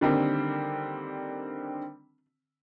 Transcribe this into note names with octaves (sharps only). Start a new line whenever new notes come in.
D3 D#3 G3 A#3 C4